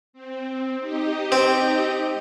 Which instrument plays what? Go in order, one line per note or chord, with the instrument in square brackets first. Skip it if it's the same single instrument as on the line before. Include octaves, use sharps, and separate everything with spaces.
[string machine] C4
D#4 G4 D#5
[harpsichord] C4